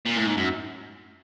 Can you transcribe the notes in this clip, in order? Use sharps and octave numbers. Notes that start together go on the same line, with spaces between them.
A#2
A2
G#2
F#2